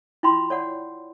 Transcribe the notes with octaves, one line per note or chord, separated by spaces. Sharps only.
E4 F4 G5 B5 C6
C#5 D5 F#5